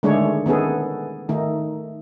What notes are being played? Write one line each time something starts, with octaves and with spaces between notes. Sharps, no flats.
D3 D#3 G#3 A3 D4 C#5
D#3 B3 C#4 G#4 A4
D#3 A3 D#4